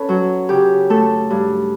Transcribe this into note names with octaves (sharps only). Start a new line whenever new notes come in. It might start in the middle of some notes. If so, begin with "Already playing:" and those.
Already playing: C#4 A4 B4 C#5
F#3
C#3 G4
A3 A4
G2